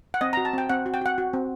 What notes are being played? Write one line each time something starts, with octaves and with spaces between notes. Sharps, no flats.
F#5
C4 D#5
A#5
F#4
A5
C4 G5
C4 F#5
F#4
G5
F#4 F#5
F#4
C4